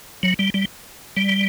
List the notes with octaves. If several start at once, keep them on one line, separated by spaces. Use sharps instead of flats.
F#3
G3
G3
G3